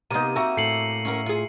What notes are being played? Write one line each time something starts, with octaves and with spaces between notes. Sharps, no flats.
C3 A#3 B3 D#4 D#7
C4 F#4 E5 A#5 C#6
A2 A4 C7 C#7 F#7
C#4 F#4 A#4
F4 G#4